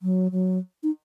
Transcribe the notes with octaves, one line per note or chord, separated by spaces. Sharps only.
F#3
F#3
D#4